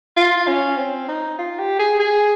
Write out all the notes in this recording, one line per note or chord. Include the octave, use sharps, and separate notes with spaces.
F4
C#4
C4
D#4
F4
G4
G#4
G#4